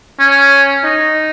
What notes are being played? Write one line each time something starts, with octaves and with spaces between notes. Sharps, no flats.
C#4
D#4